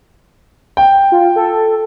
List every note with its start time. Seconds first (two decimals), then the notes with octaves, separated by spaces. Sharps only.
0.77 G5
1.12 F4
1.36 A4